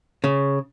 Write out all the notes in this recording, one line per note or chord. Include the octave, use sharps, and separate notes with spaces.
C#3